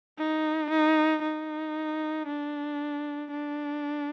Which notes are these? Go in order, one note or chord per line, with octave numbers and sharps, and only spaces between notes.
D#4
D#4
D#4
D4
D4